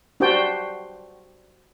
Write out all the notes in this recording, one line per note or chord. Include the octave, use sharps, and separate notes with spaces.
D4 F#4 G4 C5 D5 G5